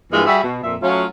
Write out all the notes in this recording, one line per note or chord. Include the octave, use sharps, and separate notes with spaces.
G2 E3 G#3 A#3 F4
G3 F#4 G#4 E5
B2
F2 A#2 E5
F#3 A3 C#4 F4